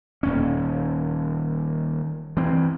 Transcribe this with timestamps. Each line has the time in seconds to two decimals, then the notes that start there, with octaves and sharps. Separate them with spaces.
0.23 D#1 D#2 C#4
2.37 E3 C4